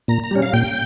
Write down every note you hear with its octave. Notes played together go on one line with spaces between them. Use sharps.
A#2 A#5
A#5
G3 C#4
F5
A#2 G5